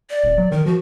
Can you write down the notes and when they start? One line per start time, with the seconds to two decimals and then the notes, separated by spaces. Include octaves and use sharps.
0.10 D5
0.24 D#1
0.38 F#3
0.52 D#3 A#4
0.66 F3 F#4